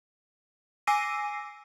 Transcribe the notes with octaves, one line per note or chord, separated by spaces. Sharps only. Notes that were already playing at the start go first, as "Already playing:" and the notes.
G#5 D6 E6 A#6 C7 D#7